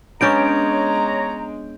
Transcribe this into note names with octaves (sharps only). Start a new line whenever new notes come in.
G#3 B3 C#4 D4 C#5 A#5 G6 D7